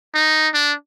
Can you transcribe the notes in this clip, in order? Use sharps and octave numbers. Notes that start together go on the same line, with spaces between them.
D#4
D4